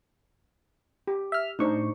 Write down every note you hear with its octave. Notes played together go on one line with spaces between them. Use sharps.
G4
E5 F6
A2 D4 D#4 C5 C#6